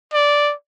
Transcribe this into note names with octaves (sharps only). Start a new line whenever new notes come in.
D5